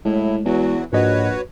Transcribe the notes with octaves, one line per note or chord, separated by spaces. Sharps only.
A2 F#3 G#3 E4
E2 E3 F#3 F#4
A#1 G#2 F#4 B4 C#5 D#5